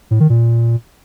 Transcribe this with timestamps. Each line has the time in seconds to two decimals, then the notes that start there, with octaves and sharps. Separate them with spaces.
0.11 A2
0.20 D#3
0.30 A#2